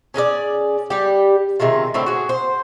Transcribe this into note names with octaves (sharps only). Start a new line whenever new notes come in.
C#4 G#4 A#4 D5
G3 G4
C3 D#3 G#3 F4
A2 D3 A3 C4
F#4 G#4
C5